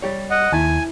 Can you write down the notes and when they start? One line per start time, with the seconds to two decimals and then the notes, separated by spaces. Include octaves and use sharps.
0.02 G3 G4 C#5
0.30 D#5 F#5
0.52 D#2 E4 G#5 A5